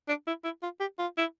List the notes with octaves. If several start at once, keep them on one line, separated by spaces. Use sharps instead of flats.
D4
E4
E4
F4
G4
F4
E4